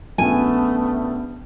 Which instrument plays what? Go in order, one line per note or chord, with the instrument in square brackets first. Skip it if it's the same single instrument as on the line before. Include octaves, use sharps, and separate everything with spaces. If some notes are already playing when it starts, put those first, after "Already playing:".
[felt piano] A#1 C#4 G5 [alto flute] A3 [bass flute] B3 [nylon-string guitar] G#5